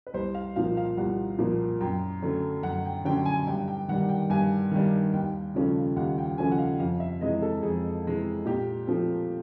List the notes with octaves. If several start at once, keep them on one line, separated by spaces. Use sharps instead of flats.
B4
C2 C5
F5
A#2 F3 A#3 F5
F5
C2 F#5
A#2 F3 A#3
F#2 G5
D3 F#3 A3 C#4
F#2 F#5
G5
D3 F#3 A3 C#4 G5
G#5
G2 G5
G5
D#3 G3 F#5
G5
G2 G#5
D#3 G3
D#2 G5
C#3 F3 A3 C#4
D#2 F#5
G5
C#3 F3 A3 C#4 G#5
F#5
F5
F2 F5
E5
C3 E3 G#3 D#5
A4
F2 G#4
C3 E3 G#3
A#2 G4
F3 A3 C4